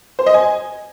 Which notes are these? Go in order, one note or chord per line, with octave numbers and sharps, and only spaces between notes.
C5
D#5
G#5